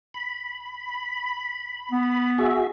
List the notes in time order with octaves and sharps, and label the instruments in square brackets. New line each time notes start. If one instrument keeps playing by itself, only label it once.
[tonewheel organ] B5
[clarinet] B3
[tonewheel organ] F#4 G#4 E5